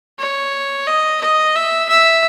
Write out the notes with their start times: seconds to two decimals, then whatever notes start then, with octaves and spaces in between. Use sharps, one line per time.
0.19 C#5
0.86 D#5
1.21 D#5
1.55 E5
1.89 E5